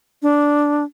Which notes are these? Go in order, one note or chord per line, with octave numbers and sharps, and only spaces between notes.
D4